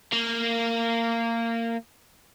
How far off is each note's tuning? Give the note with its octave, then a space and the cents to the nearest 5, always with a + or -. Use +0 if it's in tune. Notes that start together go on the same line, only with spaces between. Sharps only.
A#3 -20